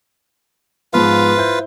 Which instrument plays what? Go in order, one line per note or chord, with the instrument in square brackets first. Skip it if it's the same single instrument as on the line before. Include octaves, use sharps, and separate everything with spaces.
[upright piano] G#2 F3 B3 [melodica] F4 B4 F5
[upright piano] E4 C5 G6